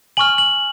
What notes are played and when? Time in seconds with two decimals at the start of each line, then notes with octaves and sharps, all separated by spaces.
0.17 G#5 C#6 F6 F#7
0.38 F#7